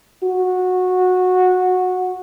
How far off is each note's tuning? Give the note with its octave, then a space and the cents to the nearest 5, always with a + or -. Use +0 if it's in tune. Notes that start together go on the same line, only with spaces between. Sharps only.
F#4 -15